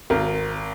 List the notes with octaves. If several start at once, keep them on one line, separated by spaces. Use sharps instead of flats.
G#1 A#4